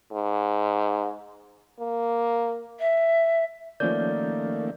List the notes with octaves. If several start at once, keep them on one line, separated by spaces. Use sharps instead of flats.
G#2
A#3
E5
D#3 F3 A3 A#3 C#4 D5 G6